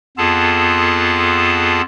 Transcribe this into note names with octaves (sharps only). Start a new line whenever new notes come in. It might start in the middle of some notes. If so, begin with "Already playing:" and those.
F2 B3 F4 G#4 A4 A5